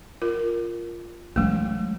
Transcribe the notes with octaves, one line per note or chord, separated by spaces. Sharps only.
F4 A#4
E3 F#3 G#3 A3